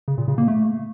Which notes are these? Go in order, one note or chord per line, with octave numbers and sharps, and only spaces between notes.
C#3
A#2
C#3
A#3
A3